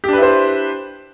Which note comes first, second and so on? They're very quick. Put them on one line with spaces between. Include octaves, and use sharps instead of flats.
G4 D4 B4 E4 C5